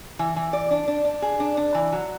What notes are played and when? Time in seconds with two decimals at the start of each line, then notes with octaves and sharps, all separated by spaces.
0.19 E3
0.36 E3
0.53 D5
0.71 D4
0.88 D4
1.05 D4
1.22 G#4
1.40 D4
1.57 D4
1.74 E3
1.92 F#3